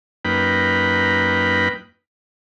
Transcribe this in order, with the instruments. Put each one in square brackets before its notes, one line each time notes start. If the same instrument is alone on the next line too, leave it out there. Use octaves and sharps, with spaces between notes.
[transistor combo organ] F#2 A#3 D#4 B4 G5 B5